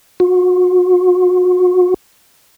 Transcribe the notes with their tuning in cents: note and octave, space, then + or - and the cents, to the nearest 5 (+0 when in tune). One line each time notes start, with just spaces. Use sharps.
F#4 -35